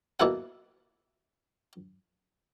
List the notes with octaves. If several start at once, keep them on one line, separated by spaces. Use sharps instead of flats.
B2 A#3 E4 A4 F#5